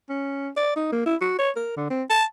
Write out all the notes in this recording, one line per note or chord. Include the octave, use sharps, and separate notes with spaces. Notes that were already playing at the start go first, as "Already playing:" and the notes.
C#4
D5
D#4
A#3
E4
F#4
C#5
A#4
D3
C4
A5